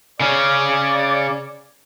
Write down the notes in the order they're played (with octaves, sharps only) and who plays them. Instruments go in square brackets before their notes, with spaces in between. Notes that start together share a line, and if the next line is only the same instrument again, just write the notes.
[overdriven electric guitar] C#3 C#4 [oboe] D5